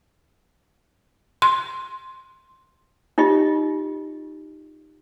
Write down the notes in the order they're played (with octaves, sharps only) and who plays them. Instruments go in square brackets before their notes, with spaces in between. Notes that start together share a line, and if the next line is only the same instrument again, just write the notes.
[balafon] C6
[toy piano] D#4 F4 G4 D#5